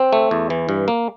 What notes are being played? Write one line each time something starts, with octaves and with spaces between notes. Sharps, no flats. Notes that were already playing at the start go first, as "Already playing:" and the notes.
Already playing: C4
A3
E2
E3
G2
A#3